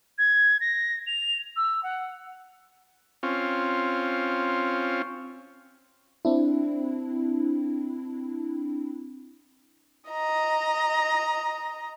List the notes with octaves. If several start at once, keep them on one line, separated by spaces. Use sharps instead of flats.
G#6
A#6
F7
E6
F#5
C4 C#4 F4
C4 D4 E4
D#5 A#5